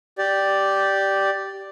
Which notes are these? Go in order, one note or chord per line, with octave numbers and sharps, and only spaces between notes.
G4 D5